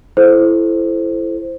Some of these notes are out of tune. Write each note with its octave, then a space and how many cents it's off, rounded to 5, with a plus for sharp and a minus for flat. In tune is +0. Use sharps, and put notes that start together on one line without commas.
E4 +20 A4 -25 C5 +0